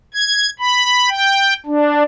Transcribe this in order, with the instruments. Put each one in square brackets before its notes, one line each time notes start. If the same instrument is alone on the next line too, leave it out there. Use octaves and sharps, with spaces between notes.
[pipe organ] G#6
B5
G5
D4